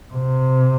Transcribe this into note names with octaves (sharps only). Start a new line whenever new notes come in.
C3